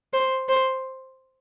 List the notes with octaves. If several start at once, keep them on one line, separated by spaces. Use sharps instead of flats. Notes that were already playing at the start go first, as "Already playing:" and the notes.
C5
C5